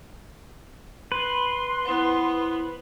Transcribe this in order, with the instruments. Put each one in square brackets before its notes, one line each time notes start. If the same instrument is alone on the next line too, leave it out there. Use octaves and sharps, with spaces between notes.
[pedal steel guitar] B4 [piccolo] C6
[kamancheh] B3 [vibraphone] E4 C5